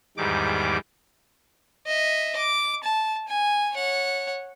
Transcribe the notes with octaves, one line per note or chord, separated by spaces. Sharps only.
E2 G#2 D#3 G3 D6
D#5 E5
D6
A5
G#5
C#5 F#5